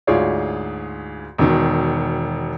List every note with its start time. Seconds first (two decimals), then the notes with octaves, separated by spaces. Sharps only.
0.07 D2 G#2 F4 G#4 C#5 D5
1.38 E1 B2 D#3